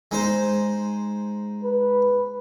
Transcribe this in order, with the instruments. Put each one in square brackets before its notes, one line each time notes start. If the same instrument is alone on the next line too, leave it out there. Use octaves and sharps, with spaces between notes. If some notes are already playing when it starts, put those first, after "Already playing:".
[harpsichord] G#3 D#4 C5
[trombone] B4